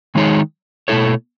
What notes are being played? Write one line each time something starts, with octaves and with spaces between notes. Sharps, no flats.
D#3 G#3 D#4 G#4 C#5
B2 A3 E4 A4 C#5